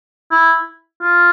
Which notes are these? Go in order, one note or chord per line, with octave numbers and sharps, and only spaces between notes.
E4
F4